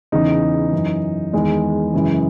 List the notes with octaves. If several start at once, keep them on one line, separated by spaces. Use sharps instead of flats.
E2 C#3 E3 D#4
F#2 E3
E2 D#3 G#3
F#2 C#3 E3